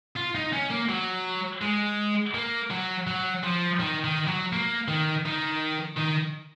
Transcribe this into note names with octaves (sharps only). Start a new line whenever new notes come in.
F4
D#4
C#4
A#3
F#3
G#3
A#3
F#3
F#3
F3
D#3
D#3
F#3
A#3
D#3
D#3
D#3